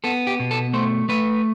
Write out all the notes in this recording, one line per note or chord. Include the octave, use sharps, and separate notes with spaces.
B3 A4
G4
B2
A4
A3 C5
A3 B4